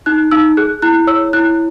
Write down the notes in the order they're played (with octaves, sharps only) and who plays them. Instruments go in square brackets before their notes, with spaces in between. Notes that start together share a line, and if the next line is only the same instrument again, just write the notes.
[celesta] D#4 F#6
D#4 E6
G#4 F#6
E4 F#6
C#5 E6
E4 F#6